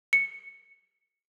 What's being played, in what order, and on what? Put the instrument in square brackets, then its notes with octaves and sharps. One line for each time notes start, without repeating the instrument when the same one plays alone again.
[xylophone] C#7